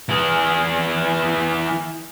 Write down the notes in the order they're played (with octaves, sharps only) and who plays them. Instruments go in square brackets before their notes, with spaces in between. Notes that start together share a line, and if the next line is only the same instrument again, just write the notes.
[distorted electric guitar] E3 G#4